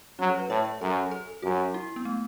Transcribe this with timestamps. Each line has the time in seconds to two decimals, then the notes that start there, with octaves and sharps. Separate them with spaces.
0.19 F#3 C#4
0.29 A4
0.39 B4
0.50 A2 C#5
0.65 C#5
0.81 F#2 A4
1.11 A4
1.42 F#2 F#4
1.74 E4
1.96 B3
2.05 A3